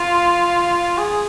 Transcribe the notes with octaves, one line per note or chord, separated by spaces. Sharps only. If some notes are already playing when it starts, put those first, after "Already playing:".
Already playing: F4
G#4